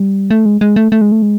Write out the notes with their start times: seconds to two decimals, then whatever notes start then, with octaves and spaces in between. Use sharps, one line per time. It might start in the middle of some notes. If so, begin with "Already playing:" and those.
Already playing: G3
0.31 A3
0.46 G#3
0.61 G#3
0.76 A3
0.92 A3
1.01 G#3
1.12 A3
1.22 G#3